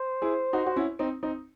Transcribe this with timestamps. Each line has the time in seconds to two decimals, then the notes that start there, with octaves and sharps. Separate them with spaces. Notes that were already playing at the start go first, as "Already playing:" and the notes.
Already playing: C5
0.22 E4 G#4
0.53 D#4 F#4
0.66 F#4
0.76 C#4 E4
0.99 C4 D#4
1.23 C4 D#4